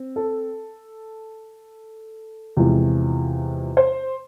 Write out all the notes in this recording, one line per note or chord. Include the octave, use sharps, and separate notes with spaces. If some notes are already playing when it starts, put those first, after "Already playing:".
Already playing: C4
A4
E2 C3 F3 G#3
C5